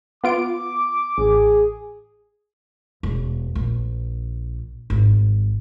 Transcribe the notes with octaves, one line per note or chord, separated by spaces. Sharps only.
B3 F4 D6 D7
A1 G#4
E1
A#1
G#1